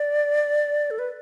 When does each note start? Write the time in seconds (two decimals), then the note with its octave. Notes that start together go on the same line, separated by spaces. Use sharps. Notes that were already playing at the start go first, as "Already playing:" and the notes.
Already playing: D5
0.91 A4
0.99 B4